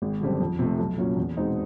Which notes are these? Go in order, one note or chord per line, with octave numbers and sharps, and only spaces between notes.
G#1
F#2 D3 G3 C4
F2
C3 F3 A3
B1
A#2 F#3 A#3 C#4
E2
B2 G#3 C4 D#4